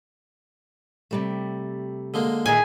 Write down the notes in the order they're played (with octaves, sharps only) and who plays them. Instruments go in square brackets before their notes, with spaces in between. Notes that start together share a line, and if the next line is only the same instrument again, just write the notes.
[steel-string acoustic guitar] C3 G3 A3
[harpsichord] D3 G#3 A#3
[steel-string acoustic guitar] A#2 D#3 E5 [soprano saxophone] G#4 [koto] G#5